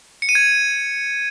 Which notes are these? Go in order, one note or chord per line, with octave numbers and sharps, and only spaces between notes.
C#7
D#7
G#6